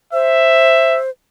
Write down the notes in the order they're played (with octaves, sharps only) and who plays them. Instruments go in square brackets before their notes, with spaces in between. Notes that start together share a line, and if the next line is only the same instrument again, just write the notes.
[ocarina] C5 [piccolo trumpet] E5